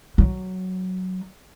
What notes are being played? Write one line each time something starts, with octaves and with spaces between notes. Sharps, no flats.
F#3